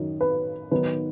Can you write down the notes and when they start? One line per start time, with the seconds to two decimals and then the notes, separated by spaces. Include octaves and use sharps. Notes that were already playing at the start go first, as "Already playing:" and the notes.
Already playing: F#2 D#3 F#3
0.21 B4
0.71 D#3 F#3 B3 D#4 B4